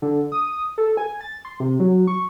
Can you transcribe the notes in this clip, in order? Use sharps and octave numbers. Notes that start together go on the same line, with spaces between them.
D3
D#6
A4
G#5
A6
C6
C3
F#3
C#6